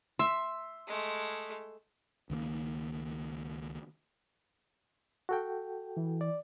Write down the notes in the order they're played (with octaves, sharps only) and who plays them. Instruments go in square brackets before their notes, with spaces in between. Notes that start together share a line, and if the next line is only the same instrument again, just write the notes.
[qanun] E5 [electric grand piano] C6
[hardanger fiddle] G#3 A3
[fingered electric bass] C#2 D#3 G3 A#3
[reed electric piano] F#4 A4 G5
[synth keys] E3
[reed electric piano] D5